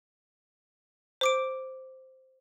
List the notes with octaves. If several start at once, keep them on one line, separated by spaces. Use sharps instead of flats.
C5 D6 D7